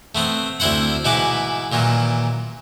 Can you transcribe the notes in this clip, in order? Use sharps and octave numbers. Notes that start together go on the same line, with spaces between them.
A3 B3 C4
D2 C4 E4 C5 F#5
G#2 B2 E3 E4 B4 D6
A#2 D#3 E3 F#3